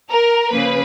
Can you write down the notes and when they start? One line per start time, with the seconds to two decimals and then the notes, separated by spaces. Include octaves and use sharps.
0.10 A#4
0.51 C#3 F3 A#3 B4